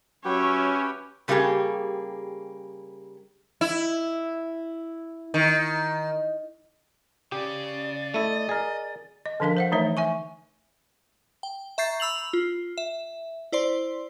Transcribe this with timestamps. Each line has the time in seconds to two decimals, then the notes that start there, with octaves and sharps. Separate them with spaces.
0.25 F#3 C#4 G4 B4 C#5 E5 G5
1.28 C#3 G3 A#3 D#4 G4 G#4
3.61 E4
5.34 D#3
7.32 C#3 G4 D5
8.14 A3 E4 D#5
8.49 G#4 A#4
9.26 D#5
9.40 D3 F3 D4 A#4 F5
9.57 C5 F5 F#5
9.72 E3 A3 D#4 C#5 E5
9.97 E5 G#5 C#6
11.43 G5
11.78 E5 A#5 C#6 G6 A6 C7
12.00 B5 E6 F7 F#7
12.33 F4
12.78 E5
13.52 E4 C5 D5 C6